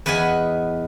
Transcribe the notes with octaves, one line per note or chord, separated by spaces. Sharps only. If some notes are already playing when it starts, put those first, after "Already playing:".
E2 B4 D#5 F#5 G#5